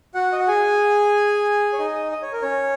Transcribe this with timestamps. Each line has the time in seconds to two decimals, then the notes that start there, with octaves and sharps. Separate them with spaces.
0.14 F#4 F#5
0.32 D#5
0.40 F#5
0.48 G#4 G#5
1.73 C#5
1.79 D#4 D#5
2.12 D#5
2.22 C#5
2.33 A#4
2.42 C#4 C#5